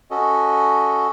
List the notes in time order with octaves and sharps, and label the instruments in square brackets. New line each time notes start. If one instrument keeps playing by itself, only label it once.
[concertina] C#4 F#4 A4 D#5